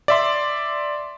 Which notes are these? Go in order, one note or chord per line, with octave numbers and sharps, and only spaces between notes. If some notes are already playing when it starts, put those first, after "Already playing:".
D5 E5 C6